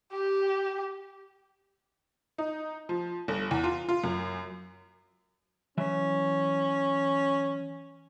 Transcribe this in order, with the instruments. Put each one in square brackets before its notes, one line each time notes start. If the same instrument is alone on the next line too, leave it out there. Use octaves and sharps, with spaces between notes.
[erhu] G4
[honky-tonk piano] D#4
F3
G1
E2
F4
F4
F#2
[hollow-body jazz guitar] E3 F#3 E5 [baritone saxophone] C#4